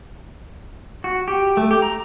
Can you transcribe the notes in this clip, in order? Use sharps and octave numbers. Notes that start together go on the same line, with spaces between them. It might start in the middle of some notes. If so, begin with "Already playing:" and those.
F#4
G4
A3
G4
A#5